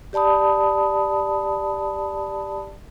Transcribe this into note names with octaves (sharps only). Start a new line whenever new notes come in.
G4 D5 A5 B5 D#6